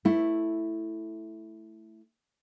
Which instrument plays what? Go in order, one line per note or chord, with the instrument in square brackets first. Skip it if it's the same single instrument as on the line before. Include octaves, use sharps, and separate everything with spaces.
[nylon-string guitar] A3 E4